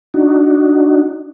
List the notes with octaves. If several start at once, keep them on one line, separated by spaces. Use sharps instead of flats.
D4 D#4 F#4